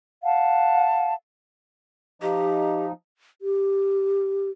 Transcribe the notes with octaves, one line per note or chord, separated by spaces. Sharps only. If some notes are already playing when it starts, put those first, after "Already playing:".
F5 F#5 A5
F3 D#4 G4
G4